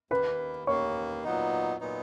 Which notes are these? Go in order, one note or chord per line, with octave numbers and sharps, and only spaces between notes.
D#2 D#3 A#3 B4 B5
D#2 D#3 A#3 C#5 C#6
A#2 F#3 B3 D#4
A#2 F#3 B3 D#4